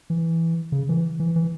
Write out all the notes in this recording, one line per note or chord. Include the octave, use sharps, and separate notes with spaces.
E3
C#3
E3
E3
E3